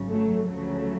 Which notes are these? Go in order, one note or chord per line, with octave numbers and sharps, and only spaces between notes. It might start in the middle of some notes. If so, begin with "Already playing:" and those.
Already playing: G#1 F#2 C#3
F#3 A3
D2 C#3 F3 F#3 A3